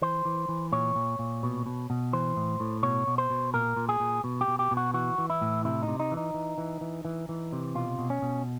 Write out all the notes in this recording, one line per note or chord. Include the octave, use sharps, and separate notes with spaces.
E3 C5
E3
E3
A#2 C#5
A#2
A#2
B2
B2
B2
E3 C5
A2
A2
B2 C#5
B2
C5
B2
A#2 A#4
A#2
G#4
A#2
B2
G4
B2
G4
B2
F#4
E3 F#4
E3
E4
A2
C3 E4
D#4
C3
D#4
E3
D#4
E3
E3
E3
E3
E3
C3
B2 F4
B2
C#4
B2